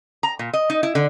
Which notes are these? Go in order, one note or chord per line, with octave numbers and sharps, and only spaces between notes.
A#5
A#2
D#5
D#4
E4
D3